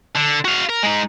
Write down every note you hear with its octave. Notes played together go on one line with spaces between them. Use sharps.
D3
F#4 F5
A#4
G#3 D#4